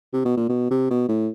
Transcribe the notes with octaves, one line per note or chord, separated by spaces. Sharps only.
C3
B2
A#2
B2
C3
B2
A2